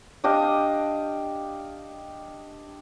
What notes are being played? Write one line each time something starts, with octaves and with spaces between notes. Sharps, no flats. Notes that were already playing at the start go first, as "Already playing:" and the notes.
D4 G4 D#5 F5